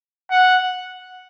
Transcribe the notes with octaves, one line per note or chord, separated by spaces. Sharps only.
F#5